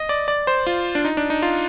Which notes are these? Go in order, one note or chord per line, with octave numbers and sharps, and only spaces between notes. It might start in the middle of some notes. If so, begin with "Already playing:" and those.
Already playing: D#5
D5
D5
C5
F4
D4
D#4
D4
D#4
F4